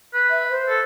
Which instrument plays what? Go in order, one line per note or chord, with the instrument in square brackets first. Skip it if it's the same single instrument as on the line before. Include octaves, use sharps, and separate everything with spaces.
[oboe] B4
[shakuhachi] E5
C5
[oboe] A4